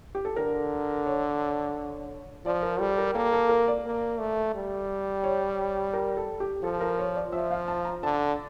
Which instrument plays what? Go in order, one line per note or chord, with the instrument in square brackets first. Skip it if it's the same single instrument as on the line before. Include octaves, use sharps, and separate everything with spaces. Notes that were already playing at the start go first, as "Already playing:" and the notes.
[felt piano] G4
A4
[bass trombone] D3 [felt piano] A#4
[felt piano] C#5
[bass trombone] F3 [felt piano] D5
[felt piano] A#4
[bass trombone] G3 [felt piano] A4
[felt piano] A#4
[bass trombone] A#3 [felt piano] A4
[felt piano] A4
A#4
D5
[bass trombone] A#3
A3
G3
[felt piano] C#5
A#4
A4
G4
[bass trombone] F3 [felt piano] A4
[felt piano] A#4
C#5
D5
[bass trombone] F3 [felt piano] E5
[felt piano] F5
A5
A#5
[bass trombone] D3 [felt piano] A5